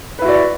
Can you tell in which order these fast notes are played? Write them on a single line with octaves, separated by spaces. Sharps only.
B4 E4 F#4 D5